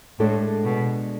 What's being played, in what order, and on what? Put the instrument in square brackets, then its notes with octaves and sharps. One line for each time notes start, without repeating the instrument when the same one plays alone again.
[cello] A2 [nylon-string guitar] G#3 D4 A4 D5
[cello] B2